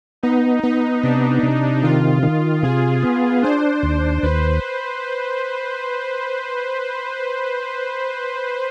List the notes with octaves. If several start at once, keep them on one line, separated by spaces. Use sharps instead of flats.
B3 D#4
B3 D#4
C3 D4
C3
D#3 F4
D#3
C3 G#4
B3
D4 C5
D#2
D#2 B4